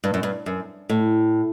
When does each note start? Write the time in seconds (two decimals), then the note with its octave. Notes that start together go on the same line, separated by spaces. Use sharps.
0.04 G2
0.14 F#2
0.23 G2
0.46 F#2
0.90 A2